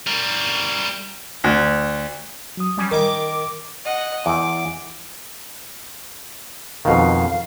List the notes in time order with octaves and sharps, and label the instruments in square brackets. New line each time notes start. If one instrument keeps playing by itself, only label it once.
[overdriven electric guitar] G3 A#4
[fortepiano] D2
[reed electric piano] F#3 D#6
[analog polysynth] G3 C#4
[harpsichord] D#3 [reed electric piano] A#4 [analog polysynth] D6
[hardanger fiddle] D#5 F#5
[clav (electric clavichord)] E2 [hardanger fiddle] D6
[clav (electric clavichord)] F2 B2 D#3 [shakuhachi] F5